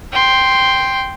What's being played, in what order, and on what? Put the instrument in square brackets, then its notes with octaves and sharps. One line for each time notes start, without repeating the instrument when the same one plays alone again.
[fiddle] G5 C6